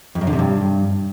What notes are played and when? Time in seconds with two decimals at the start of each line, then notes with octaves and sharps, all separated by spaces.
0.15 F2
0.21 F#2
0.27 D3
0.33 C3
0.39 G2